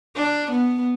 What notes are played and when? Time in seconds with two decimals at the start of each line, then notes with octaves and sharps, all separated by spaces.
0.16 D4
0.51 B3